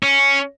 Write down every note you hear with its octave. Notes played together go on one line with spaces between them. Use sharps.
C#4